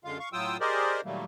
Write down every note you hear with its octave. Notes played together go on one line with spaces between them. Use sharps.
F#2 D3 G#3 F4 F5
F5 C#6
A2 F#3 F4 G5 D#6 E6
G4 G#4 A#4 C5 D5 D#5
A#2 D#3 F#3 G3 A3 A#3